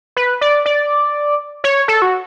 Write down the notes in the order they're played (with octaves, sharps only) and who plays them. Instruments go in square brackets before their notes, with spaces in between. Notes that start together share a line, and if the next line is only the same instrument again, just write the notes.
[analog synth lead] B4
D5
D5
C#5
A4
F#4